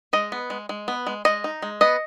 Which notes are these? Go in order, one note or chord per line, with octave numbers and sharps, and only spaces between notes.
G#3 D#5
B3
G#3
G#3
B3
G#3
G#3 D#5
D#4
G#3
B3 D#5